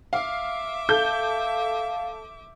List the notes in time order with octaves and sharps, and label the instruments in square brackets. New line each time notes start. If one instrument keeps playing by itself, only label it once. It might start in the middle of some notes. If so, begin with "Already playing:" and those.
[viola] E5 D6 [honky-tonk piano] F5
[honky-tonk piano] A4 G6 [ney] F5